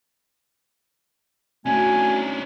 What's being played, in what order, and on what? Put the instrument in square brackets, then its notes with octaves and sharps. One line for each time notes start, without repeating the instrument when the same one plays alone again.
[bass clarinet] A3 [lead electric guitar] C#4 D4 [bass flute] F#4 [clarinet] G#5